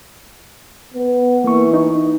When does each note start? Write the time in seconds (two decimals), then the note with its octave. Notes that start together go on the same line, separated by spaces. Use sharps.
0.94 B3
1.44 E3 A#3 C#6
1.74 D#4